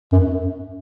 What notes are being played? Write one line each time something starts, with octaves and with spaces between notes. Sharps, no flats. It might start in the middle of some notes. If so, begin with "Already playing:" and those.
F#2